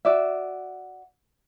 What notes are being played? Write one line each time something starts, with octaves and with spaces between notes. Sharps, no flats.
F#4 D5 E5